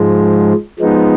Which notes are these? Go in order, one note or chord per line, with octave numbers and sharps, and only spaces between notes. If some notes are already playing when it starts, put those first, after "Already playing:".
Already playing: G#2 F3 G#3
F3 G#3 B3 D#4